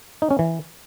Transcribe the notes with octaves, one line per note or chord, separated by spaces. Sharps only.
D#4
C#4
E3